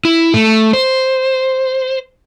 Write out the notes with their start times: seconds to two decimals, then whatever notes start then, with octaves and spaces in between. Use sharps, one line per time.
0.05 E4
0.34 A3
0.73 C5